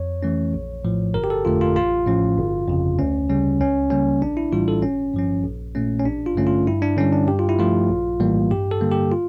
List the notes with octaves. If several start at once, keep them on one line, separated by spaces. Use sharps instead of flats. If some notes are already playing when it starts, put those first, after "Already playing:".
Already playing: F2 C#5
E3 A3 C#4
A#1
A2 F3
G1 A#4
G4
A4
F2 D3 A3 F4
F4
A1 F4
A2 F3 C#4
G1
F2 C#3
D2 C#4
C#3 G3 C#4
C#2 C#4
C#3 G3 A#3 C#4
A#1 D4
E4
A2 E3 G3 F4
A4
G1 C#4
G2 F3 C#4
A#1
A#2 A3 C#4
C#4
A1 D4
F4
G2 D3 A3 C#4
F4
G2 E4
D4
D3 G3 C#4
D4
G2 G4
F4
E4
F3 A3 F4
A#1
A2 E3 G3 A#3
G2 G4
A4
D3 G3 A#3
G4
F4